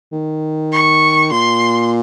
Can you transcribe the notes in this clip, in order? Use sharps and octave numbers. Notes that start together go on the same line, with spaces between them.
D#3
C#6
A#2 C6